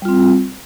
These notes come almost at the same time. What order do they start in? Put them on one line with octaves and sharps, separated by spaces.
G3 F4 C4